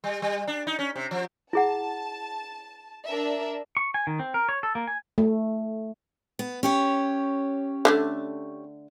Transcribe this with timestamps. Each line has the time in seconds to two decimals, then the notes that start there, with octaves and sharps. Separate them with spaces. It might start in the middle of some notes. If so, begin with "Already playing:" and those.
0.04 G3
0.22 G3
0.47 D4
0.67 D#4
0.79 C#4
0.96 C3
1.11 F3
1.53 E4 G#4 F#5 A5
3.06 D4 A#4 E5
3.77 C#6
3.94 G#5
4.07 D#3
4.19 C4
4.34 A#4
4.49 C#5
4.63 A4
4.75 A#3
4.87 G#5
5.18 A3
6.39 B3
6.63 C#4 G4 C#5
7.85 D3 F#3 A3